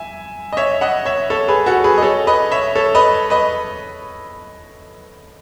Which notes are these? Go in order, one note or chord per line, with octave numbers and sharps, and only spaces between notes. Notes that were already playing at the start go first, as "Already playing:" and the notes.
Already playing: E5 G#5
D#5
C#5 E5
D#5 F#5
C#5 E5
A4 C#5
G#4 B4
F#4 A4
G#4 B4
D#5
A4 C#5
B4 D#5
C#5 E5
A4 C#5
B4 D#5
B4 D#5